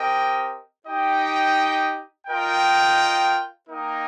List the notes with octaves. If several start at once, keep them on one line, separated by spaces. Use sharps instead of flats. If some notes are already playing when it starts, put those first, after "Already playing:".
Already playing: C4 G4 A#4 D#5 G5
D#4 G4 D#5 G5
F4 A#4 D#5 G5
A#3 D#4 A#4 D#5 G5